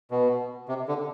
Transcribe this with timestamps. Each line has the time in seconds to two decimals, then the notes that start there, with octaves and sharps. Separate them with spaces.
0.11 B2
0.68 C3
0.88 D3